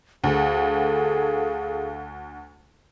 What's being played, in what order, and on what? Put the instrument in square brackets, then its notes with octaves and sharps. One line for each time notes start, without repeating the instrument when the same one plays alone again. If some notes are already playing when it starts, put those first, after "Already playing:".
[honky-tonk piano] D2 [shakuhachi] G#4 [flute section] A4 F5